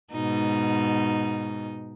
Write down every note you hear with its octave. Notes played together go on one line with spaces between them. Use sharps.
G#2 B2 D#4